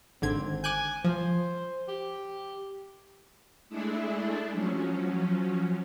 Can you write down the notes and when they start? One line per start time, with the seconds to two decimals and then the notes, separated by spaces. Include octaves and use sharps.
0.22 G#1 D3 C4 G#6
0.64 G#5 D6 F#6 G6
1.04 F3 C5
1.88 G4
3.69 G#3 A3 D4 E4 G#4 A4
4.52 F3 F#3 C#4